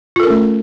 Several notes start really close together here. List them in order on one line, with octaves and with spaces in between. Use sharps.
F4 A4 A#4 C#4 A3